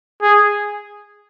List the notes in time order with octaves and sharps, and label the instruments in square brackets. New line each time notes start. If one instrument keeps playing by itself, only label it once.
[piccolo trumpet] G#4